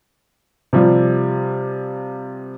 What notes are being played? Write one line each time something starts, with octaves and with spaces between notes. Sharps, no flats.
C3 F3 G3